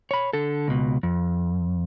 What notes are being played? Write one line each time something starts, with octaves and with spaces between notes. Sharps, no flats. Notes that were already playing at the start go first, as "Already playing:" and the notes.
C#5 B5
D3 A4
C#2 B2
F2